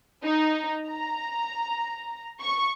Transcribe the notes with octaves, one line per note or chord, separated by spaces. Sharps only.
D#4
A#5
C#6